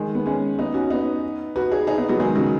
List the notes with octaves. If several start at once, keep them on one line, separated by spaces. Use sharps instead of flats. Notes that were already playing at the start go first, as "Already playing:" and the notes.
Already playing: D#3 G#3
B3
G#3 C#4
B3 D#4
C#4 F#4
B3 D#4
F#4 B4
D#4 G#4
D#4 G#4
B3 D#4
F#3 B3
D#3 G#3
C#3 F#3